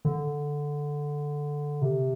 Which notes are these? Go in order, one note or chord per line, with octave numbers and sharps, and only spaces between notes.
D3
C3